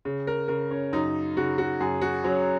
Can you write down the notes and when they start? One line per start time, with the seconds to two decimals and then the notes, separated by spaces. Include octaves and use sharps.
0.05 C#3
0.27 A#4
0.48 C#3 A#4
0.71 C#4
0.93 F#2 D#4
1.37 C#3 F#4
1.58 F#4
1.80 F#2 G#4
2.02 F#4
2.24 F#3 C#4